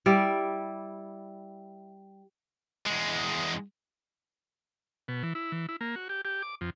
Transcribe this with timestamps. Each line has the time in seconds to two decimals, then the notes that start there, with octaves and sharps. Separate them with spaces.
0.06 G3 E4 D5
2.87 E2 G#3
5.08 B2
5.23 E3
5.35 E4
5.52 E3
5.69 E4
5.81 A#3
5.96 F#4
6.09 G4
6.25 G4
6.42 D6
6.61 F2